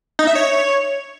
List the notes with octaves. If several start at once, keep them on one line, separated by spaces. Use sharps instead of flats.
D#4
E5
C#5